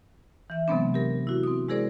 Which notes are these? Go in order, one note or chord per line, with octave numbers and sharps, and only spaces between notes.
E3 E5
C3 F#3 G#3 B3 C4 D4
G4 A#4
E4 F#4
C4 D#6
G#3 E4 G#4 A#4 C5 D5